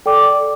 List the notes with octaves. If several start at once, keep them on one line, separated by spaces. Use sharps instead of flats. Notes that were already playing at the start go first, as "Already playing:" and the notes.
A4 D5 G5 D6